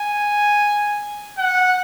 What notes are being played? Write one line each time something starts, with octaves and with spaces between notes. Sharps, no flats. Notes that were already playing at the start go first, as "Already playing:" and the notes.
Already playing: G#5
F#5